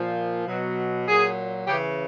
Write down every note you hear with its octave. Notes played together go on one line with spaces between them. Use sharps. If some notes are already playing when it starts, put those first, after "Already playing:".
Already playing: A#2 F3
B2 F#3
A#2 F#3 G#4
C#3 E3 G4